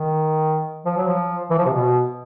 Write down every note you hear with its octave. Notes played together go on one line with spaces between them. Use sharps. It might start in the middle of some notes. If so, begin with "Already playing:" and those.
Already playing: D#3
F3
F#3
F3
E3
F3
C3
B2